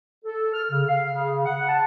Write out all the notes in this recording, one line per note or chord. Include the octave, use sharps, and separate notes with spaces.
A4
F6
C#3
F5
C#3
F#5
A5